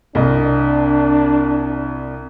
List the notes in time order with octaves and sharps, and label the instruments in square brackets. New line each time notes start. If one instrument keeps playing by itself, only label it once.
[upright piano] C2 D#5 [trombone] D4